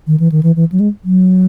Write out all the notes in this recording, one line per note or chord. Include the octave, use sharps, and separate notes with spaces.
D#3
E3
D#3
E3
E3
F#3
G#3
F#3